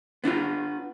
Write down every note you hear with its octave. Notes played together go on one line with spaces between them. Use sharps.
B3 D4 D#4 F4